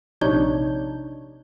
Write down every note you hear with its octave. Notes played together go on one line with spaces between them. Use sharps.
A#1 C3 D4 D#4 C#5 G6